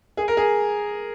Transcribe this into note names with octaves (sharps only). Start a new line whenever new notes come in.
G#4
A#4
G#4